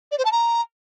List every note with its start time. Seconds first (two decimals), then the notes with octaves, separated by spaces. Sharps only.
0.11 D5
0.18 C5
0.25 A5
0.32 A#5